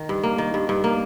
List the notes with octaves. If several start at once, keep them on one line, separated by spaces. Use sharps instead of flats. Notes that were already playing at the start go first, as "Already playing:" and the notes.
Already playing: D#3
G2
A#3
D#3
G2
G2
A#3